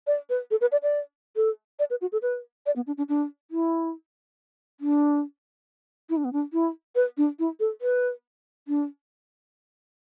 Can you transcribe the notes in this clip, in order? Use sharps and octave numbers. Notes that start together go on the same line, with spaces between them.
D5
B4
A4
B4
D5
D5
A4
D5
B4
F#4
A4
B4
D5
B3
D4
D4
D4
E4
D4
E4
D4
B3
D4
E4
B4
D4
E4
A4
B4
D4